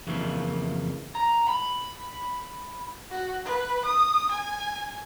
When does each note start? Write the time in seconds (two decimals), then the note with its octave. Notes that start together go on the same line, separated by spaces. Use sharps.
0.07 F2 C#3 E3 A3 A#3
1.15 A#5
1.48 B5
3.11 F#4
3.45 B4
3.86 D#6
4.32 G#5